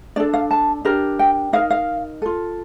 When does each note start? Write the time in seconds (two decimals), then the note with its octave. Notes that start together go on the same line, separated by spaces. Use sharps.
0.16 D4 A4 D5
0.33 F5
0.51 A5
0.85 D4 G4 A#4
1.19 G5
1.53 D#4 A#4 F5
1.70 F5
2.22 F4 A4